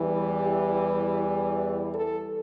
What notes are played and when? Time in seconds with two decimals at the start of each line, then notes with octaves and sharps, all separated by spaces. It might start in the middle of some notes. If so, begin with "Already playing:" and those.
Already playing: E2 E3 G3
0.39 G4
1.93 A4